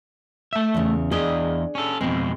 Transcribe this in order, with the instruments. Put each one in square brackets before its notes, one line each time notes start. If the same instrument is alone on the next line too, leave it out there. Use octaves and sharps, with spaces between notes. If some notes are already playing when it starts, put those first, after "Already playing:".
[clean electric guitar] A3 E5
[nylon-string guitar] E2 C#3
[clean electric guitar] E2 D#5 [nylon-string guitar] D4 G#4 D5
[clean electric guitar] C#4 A4
[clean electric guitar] F2 B2 G#3 [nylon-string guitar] C4